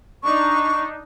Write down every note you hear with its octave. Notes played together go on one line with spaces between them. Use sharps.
D4 D#4 C#6